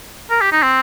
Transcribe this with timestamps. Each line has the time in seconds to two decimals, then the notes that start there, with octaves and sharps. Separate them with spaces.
0.31 A#4
0.41 G4
0.52 D#4
0.62 C4